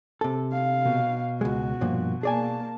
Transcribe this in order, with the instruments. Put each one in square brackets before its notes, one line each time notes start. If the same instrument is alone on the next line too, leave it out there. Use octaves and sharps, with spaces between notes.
[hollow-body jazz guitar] C3 A4
[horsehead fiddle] F5
[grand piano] B2
[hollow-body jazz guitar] C#2 G#3 [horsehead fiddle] F#4
[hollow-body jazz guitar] G2 A#2 F3
[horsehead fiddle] A#3 A5 [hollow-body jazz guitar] G#4 D5 G#5